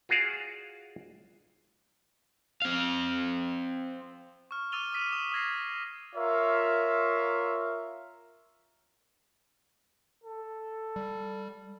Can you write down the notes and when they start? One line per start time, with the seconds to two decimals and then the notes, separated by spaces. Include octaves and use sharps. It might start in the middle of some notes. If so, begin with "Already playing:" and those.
0.09 F4 F#4 G#4 D5 F5
2.62 C4 F5
4.51 C#6 F6
4.72 D6 E6 A6 D#7 F7 G7
4.93 D6 D#6 B6 D#7
5.12 D#6 E7
5.32 D#6 F6 G#6 A#6 C7
6.16 F4 A#4 C#5 E5 F5
10.24 A4
10.96 G3